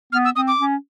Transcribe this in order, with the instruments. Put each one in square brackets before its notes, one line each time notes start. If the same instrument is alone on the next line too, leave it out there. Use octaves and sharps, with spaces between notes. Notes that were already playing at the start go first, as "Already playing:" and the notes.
[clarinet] B3 [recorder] F6
[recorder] E6
[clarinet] C4 [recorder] D#6
[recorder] D6
[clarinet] C#4